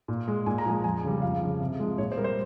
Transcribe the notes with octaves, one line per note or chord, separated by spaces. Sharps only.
A#2
G#3
A#2 G#5
A#5
F3 G#3 G#5
F2 G#5
C#3 G3
F2 F5
C#3 F3
C3
F3 G#3
A#2 C#5
C5
G3 A#4
C5